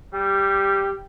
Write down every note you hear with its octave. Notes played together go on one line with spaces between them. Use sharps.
G3 G4